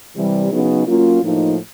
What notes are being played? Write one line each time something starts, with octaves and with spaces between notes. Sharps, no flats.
C3 E3 G3
C#3 F#3 B3 D#4 G#4
F#3 A#3 C#4 F4
A2 F3 A#3 D#4